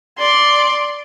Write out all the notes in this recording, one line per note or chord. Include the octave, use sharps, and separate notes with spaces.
D5 C6